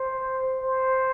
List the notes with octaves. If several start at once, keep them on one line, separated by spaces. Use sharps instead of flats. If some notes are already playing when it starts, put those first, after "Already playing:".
Already playing: C5
C5